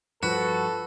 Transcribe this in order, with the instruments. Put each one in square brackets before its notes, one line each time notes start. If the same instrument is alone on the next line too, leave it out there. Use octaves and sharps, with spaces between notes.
[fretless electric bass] G2 F3 [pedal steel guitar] F#4 [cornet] A4 [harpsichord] B4